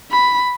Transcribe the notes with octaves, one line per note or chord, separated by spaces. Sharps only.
B5